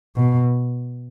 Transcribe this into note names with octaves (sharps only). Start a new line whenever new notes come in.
B2